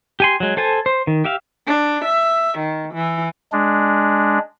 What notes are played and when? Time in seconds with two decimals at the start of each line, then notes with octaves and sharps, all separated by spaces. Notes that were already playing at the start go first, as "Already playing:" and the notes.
0.20 G4 G#5 C6
0.40 F#3 G#3
0.57 A4 C5 G#5 A5
0.86 C5
1.07 D#3
1.25 G4 E5 F5
1.67 D4
2.05 E5
2.58 D#3
2.93 E3
3.52 G#3 D4